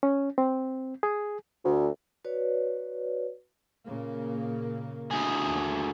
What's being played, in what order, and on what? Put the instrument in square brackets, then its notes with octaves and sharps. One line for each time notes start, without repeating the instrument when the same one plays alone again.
[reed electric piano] C#4
C4
G#4
[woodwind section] D2
[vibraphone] F#4 B4 C#5 D5
[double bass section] A#2 C#3 A#3
[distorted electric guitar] D2 G#4
[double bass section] D#2